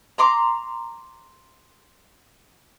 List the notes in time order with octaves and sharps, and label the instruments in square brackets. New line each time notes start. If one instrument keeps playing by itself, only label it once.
[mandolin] A#5 C6 D6